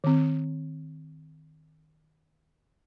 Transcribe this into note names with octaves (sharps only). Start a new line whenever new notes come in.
D#3 C4